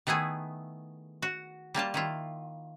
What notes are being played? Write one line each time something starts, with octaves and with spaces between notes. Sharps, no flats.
D#3 A3 B3 E4 G#4
F#4
G3 A#3 F4 A5
D#3 E4 F4